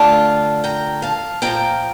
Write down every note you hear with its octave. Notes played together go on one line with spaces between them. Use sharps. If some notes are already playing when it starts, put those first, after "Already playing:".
Already playing: D3 A3 D4 F4 F5 A5
G5 A#5
F5 A5
A#2 F3 C#4 F4 G5 A#5